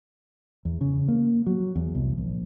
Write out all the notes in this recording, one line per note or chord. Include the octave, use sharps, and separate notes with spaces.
E2
C#3
A#3
F#3
E2
C2
A#1